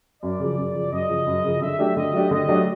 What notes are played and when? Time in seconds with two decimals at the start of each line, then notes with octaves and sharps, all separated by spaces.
0.22 F#2 D5
0.40 C#3 F3
0.58 F#2
0.75 C#3 F3
0.92 F#2 D#5
1.10 C#3 F3
1.27 F#2
1.44 C#3 F3
1.61 D3 E5
1.79 F#3 A3 D4 G4
1.96 D3 D#5
2.13 F#3 A3 D4 G4
2.31 D3 D#5
2.49 F#3 A3 D4 G4